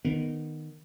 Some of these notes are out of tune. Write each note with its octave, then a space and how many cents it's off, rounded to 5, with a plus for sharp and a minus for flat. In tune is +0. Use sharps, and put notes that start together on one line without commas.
D#3 -15 B3 +0